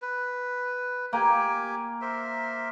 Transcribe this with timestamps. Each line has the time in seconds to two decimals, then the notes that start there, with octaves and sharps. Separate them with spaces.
0.02 B4
1.13 A#3 G4 G5 G#5
2.01 A#4 C5 E5